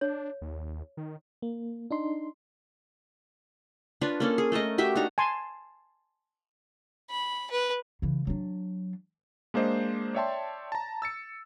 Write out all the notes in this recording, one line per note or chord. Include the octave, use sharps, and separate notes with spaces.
D4 C#5
D#2
D#3
A#3
D4 D#4 C6
D4 F4 B4 C#5
A#3 C#4 A4
G#4
A3 A4 A#4 D#5
F#4 G4 E5 G5
D4 D#4 F#4 A#5
G#5 A5 C6
B5
B4
C#3 E3
F#3 D4
G#3 A#3 D4 C5 D#5
C#5 D5 E5 G5 A5 C6
A5 A#5
E6 A6 C#7